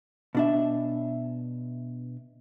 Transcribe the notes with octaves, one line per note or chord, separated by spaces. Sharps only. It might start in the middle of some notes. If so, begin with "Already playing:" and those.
B2 D4 E5